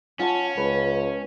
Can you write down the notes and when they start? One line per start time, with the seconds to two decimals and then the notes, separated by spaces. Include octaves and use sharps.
0.19 C#4 F4 F#5 A5
0.57 C#2 B4